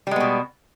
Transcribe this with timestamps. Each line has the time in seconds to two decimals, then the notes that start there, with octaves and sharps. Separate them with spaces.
0.07 G3
0.11 G#3
0.16 B3
0.20 B2